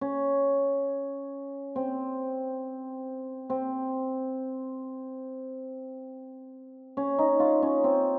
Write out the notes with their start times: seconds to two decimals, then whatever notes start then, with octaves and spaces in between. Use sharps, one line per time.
0.01 C#4
1.76 C4
3.50 C4
6.97 C#4
7.19 D#4
7.40 F4
7.62 C#4
7.84 C4